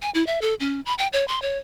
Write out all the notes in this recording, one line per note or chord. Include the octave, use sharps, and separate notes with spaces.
G#5
E4
E5
A4
C#4
B5
G5
C#5
C6
C#5